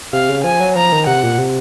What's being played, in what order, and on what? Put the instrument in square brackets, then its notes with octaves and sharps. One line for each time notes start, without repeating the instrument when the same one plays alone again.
[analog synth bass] C3 [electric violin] F5
[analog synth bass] C#3
[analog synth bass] F3 [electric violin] G#5
[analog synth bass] F#3
[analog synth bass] F3 [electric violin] A#5
[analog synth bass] D#3
[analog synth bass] C3 [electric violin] F#5
[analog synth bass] A#2
C3